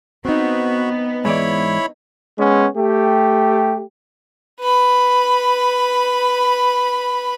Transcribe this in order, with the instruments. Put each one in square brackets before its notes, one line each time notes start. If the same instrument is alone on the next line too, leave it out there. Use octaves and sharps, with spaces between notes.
[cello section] B3 [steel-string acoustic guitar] C4 D#4 [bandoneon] F#4
[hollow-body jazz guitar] G#2 E3 D5 [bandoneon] E4 C#5 B5
[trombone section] G#3 B3 C#4
A3 G4
[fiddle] B4 B5